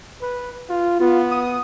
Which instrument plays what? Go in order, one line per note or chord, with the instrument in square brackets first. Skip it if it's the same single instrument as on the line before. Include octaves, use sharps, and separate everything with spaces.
[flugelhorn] B4
F4
[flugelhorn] B3 [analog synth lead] F4
[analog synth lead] D#6